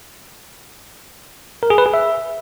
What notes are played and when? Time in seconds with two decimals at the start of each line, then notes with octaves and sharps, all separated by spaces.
1.63 A#4
1.70 G#4
1.78 B4
1.86 G#4
1.94 E5